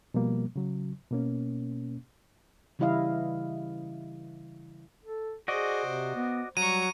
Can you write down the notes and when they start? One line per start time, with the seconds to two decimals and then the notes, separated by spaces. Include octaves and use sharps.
0.14 B2 F3 G3 A#3
0.56 C#3 F#3
1.11 B2 A#3 C#4
2.79 C#3 E3 G3 E4 D#5 F5
5.04 A4
5.48 F#4 G#4 C5 D5 D#5
5.86 C3
6.16 B3
6.57 F#3 G3 A#5 C#6 D#7